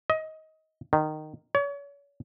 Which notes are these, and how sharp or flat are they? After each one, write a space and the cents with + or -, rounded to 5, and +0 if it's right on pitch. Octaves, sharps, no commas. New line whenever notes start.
D#5 +20
D#3 -15
C#5 +35